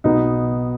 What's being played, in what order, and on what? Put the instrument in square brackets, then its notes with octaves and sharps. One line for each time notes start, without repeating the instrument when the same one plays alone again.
[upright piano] B1 B2 B3 D#4